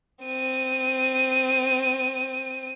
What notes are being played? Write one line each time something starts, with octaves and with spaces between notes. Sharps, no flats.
C4 D#7